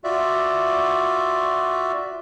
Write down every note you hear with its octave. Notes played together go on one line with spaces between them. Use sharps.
F4 F#4 D5 E5